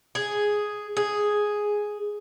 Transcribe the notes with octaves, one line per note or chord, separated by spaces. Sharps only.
G#4
G#4